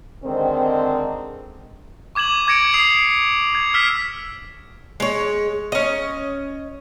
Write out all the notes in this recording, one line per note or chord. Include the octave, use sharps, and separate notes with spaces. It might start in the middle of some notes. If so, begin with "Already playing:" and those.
D3 D#3 G#3 C4
C#6 D6 G#6 E7 F#7
D6 G#6 A#6 C#7 D7
D#6 C7 F7
G#6
E6 F6 B6 E7
G#3 C#5
C#4 D#5